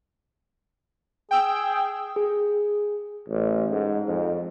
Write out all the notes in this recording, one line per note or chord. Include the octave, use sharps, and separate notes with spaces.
G#4 G5 E6
G#4
A1
G#2
F2